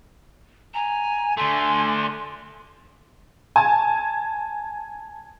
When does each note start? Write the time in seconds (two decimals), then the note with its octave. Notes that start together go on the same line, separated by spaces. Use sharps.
0.74 G#5 A#5
1.37 D3 A3 G#5 C6
3.56 G#5 A5